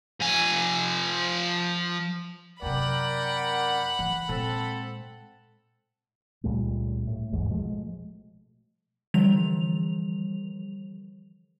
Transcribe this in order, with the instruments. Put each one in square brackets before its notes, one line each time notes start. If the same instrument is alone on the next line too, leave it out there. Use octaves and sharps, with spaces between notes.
[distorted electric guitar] F3 G#5
[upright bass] F#2 C3 [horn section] A#4 D5 G5 [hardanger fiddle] F#5 B5
[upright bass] E3
[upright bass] A#2 G#3 [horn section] C4 A4
[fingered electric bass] C#2 A#2 G3 A3
A2
A1 E2 G#2
B2 F3 G#3 A3
[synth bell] D3 E3 F3 G3 F7